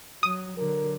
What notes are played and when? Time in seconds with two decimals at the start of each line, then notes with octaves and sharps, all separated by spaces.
0.23 F#3 D#6
0.58 D3 F#3 A#4